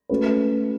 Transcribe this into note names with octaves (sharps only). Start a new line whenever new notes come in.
A3 C#4 F#4 B4